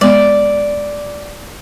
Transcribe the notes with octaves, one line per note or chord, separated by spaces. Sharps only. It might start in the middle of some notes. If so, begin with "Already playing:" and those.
G#3 B3 D5